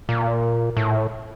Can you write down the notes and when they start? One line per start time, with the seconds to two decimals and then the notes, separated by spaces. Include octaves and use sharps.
0.09 A#2
0.77 A2